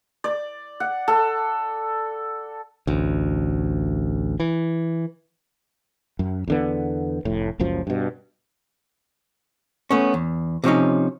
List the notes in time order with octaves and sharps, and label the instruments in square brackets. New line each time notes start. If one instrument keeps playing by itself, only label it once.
[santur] D5
F#5
A4
[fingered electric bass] A1 D2
E3
[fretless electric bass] F#2
E2 D3 B3
F1 A2
F#1 C#2 F#2 F3
G2 B2
[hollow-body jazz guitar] A3 B3 C#4
E2
C3 F3 C#4 D#4